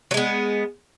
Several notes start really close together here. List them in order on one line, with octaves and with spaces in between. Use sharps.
F#3 G#3 B3